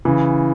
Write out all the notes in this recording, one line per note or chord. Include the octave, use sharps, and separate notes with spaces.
C#3 E3